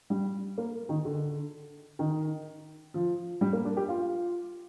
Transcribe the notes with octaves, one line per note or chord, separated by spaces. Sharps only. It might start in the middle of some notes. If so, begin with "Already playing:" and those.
G3
A#3
D#3
D3
D#3
F3
G3
A#3
D4
G4
F4